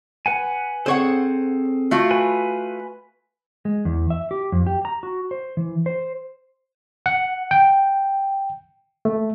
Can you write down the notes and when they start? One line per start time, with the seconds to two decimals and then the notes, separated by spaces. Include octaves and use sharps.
0.26 B4 F#5 G#5
0.86 C4 G#4 A4 C5 C#5 F#5
1.91 A3 F4 F#4
2.11 B4 G#5
3.65 G#3
3.85 E2
4.10 E5
4.31 G4
4.52 F2
4.67 G4
4.85 A#5
5.03 F#4
5.31 C5
5.57 E3
5.86 C5
7.06 F#5
7.51 G5
9.05 A3